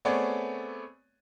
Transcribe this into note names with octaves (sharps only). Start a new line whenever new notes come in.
A3 B3 C4 G#4 C#5 D5